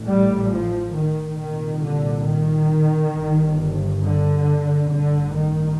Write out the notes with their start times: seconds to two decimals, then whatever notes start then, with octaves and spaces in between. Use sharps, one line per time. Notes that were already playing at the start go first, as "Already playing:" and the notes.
Already playing: A1 A2
0.09 G3
0.53 F3
0.97 D#3
1.40 C2 A#2 D#3
1.84 D3
2.28 D#3
3.15 G1 G2
4.03 D3
4.90 A1 G2 D3
5.34 D#3